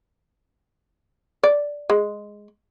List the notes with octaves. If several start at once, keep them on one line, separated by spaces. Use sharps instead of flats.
D5
G#3